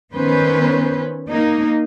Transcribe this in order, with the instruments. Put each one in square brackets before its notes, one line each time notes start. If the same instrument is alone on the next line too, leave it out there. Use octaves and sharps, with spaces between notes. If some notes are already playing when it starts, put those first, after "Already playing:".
[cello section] D#3 B3 C#4 B4 C5
A#3 D#4